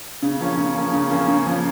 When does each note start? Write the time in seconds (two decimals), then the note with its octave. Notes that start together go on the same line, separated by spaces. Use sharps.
0.22 C#3
0.41 F3 A#3 C#4
0.57 C#3
0.76 F3 A#3 C#4
0.93 C#3
1.11 F3 A#3 C#4
1.28 C#3
1.46 F3 A#3 C#4